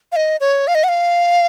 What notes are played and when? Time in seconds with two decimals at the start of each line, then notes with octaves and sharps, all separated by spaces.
0.12 F5
0.16 D#5
0.40 C#5
0.68 F5
0.75 D#5
0.84 F#5
0.89 F5